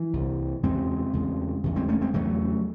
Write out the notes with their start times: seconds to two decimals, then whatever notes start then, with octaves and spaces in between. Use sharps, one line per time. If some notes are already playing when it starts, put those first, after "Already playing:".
Already playing: E3
0.13 C2 C3
0.63 E2 C#3 G#3 C4
1.13 E2 C#3
1.64 E2 C#3
1.76 G#3 C4
1.88 A3 C#4
2.01 G#3 C4
2.14 E2 C#3 F#3 A3